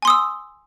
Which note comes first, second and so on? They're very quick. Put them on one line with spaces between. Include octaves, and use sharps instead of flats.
G#5 C6 D#6 E6